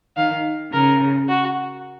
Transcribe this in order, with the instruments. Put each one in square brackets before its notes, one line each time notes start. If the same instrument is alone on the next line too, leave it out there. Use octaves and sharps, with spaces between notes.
[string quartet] D#3 [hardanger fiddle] F5
[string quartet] C#3 [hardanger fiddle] A#4
[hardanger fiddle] F#4